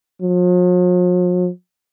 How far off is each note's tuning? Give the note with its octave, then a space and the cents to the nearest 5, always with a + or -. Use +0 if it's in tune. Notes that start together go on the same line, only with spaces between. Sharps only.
F3 +45